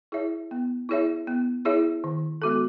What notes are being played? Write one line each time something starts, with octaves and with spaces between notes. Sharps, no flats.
E4 G#4 C#5 E5
B3
E4 G#4 C#5 E5
B3
E4 G#4 C#5 E5
D#3
G#3 B3 F#4 A4